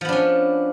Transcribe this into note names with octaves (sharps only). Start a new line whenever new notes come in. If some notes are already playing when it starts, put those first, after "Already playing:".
F3 B3 C#4 D4